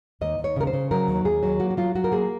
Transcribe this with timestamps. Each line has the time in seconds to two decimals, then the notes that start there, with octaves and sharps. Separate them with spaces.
0.21 D#2 D#5
0.39 D#2
0.44 C#5
0.56 C#3 A#4
0.67 C5
0.73 C#3
0.91 F#3 A#4
1.08 D#2
1.25 D#2 G#4
1.43 F#3
1.60 A#3 F#4
1.70 F#4
1.77 F#3 F4
1.95 F#3 F#4
2.04 A#4
2.12 A#3 G#4